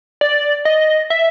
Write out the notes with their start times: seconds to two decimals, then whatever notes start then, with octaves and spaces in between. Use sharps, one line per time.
0.21 D5
0.65 D#5
1.10 E5